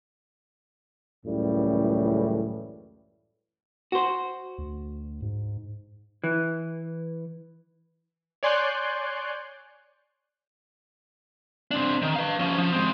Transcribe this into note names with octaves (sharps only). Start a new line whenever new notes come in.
C#2 F#2 A2 C#3 E3 G3
F#4 C5
D2
G#2
E3
C#5 D5 G#5 C6 F#6 G6
C4 D4
D#3
B4 F5
F3 C#4
F3
G#3 C4